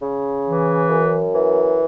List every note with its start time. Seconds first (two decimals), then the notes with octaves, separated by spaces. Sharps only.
0.01 C#3
0.45 E3
0.90 F#2
1.34 E3